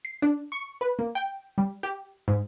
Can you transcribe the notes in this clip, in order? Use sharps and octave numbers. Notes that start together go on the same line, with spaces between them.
C7
D4
C#6
B4
A#3
G5
G3
G4
G#2